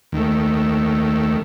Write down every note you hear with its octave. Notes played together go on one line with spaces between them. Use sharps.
D#2 D#3 A3